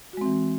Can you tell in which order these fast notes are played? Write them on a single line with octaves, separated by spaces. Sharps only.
F#4 G#3 C4 E3